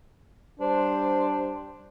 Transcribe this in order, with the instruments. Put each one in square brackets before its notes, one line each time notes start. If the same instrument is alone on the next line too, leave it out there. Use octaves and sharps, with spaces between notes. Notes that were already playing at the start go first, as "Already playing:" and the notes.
[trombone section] G3 C5 [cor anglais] D4